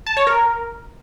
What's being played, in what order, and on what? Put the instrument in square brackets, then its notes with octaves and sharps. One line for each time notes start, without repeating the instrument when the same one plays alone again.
[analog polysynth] A5
C#5
A#4